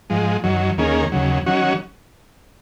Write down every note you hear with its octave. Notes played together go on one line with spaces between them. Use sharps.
G#2 F3 G#3
F#2 D#3 F#3
D#2 D#3 A#3 C#4 G#4
D#2 C#3 F#3
D#3 F#3 C#4 F#4